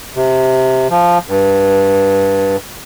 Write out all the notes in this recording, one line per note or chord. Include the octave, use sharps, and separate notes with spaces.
C3
F3
G2